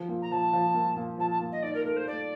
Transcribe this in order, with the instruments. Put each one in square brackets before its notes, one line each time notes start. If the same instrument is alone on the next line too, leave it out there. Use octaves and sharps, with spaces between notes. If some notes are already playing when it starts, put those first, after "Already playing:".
Already playing: [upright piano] F3
A#2
[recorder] A#5
[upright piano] F3 [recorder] A5
[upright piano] F3
A#2
A#2
[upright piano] F3 [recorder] A5
[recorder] A5
[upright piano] A#2
[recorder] D#5
[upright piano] D#4 [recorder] D5
[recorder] A#4
[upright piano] A3 [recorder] A#4
[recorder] C5
[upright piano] A3 [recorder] D5